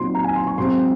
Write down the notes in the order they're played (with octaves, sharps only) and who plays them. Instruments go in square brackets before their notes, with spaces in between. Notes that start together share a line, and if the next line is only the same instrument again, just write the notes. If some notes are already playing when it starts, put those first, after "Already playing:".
Already playing: [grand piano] A#2 F#3 C4 D#4 C6
A#5
G#5
C6
C#6
G#2 F#3 C4 C6